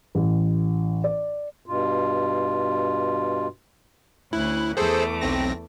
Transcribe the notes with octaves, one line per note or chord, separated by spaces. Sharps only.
A1
D5
G2 B2 F4
D2 C#4 E4 F#6
E2 A3 G#4 A4 C5 D6
B1 C4 A#6